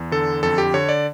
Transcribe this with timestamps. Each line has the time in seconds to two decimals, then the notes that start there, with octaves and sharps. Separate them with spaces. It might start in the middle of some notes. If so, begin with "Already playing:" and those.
Already playing: E2
0.12 D3 A4
0.43 F2 A4
0.58 G4
0.74 D3 C#5
0.89 D5